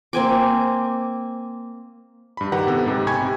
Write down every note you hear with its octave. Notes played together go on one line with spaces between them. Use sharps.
A#3 C4 G#5 D6
G2 B5
D#3 G4 B4 F#5 A#5
C3 B3 A4
G#2 C3
G5 G#5 A#5 B5 C#6 G#6
C3